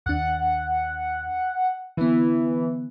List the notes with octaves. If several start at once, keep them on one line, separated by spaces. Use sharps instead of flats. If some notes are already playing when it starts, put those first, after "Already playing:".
D#2 D4 F#5
D3 E3 B3